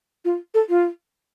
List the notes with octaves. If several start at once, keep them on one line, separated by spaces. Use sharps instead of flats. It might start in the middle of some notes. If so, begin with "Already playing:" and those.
F4
A4
F4